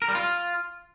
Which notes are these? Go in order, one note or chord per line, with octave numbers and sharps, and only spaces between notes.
A#4
G3
F4